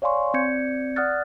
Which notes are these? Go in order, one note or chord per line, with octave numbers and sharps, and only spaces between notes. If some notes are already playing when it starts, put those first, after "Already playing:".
C#5 D5 F5 G#5 C6 C#6
C4 D5 G6 G#6 C#7
D5 F#5 D#6 F6 F#6 A6